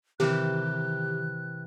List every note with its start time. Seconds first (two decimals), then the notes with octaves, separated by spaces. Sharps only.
0.20 C3 D#3 E3 G4 A#4 F#6